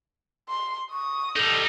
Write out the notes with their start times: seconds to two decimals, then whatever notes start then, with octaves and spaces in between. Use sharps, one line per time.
0.49 C6
0.92 C#6 D#6
1.36 G3 D#4 A4